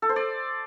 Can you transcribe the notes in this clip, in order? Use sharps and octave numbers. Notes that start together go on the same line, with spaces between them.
A4
C5
D5